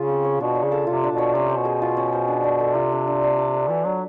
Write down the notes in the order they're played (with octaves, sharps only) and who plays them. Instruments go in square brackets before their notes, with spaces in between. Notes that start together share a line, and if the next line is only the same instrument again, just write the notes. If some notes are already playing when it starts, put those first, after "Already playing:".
Already playing: [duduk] C#3 [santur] F4 G#4
[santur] C4
C#5
[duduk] B2 [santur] D4
[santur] C#5
[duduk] C#3
[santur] A4
[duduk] C3 [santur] F4
[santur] D4
[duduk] B2
[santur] C#5
[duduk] C3 [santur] C#4
[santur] C5
[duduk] B2
[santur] G#4
F4
C#4
C5
D4
D4
A4
[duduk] C3 [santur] F4
[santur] D4
D4
D4
D5
B4
[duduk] E3 [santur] F#4
[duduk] F#3 [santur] D4